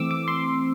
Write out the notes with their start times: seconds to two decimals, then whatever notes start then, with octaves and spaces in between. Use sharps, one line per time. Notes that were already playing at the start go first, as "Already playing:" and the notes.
Already playing: E3 A3 C4 D6 E6
0.11 D6
0.28 C6